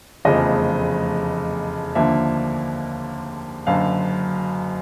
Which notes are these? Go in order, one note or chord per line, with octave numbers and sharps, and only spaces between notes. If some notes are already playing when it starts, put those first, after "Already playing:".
F1 E2 C#3 F3 A3 D#5
D#2 D3 F3 A#3 E5
F#1 F#2 D3 F5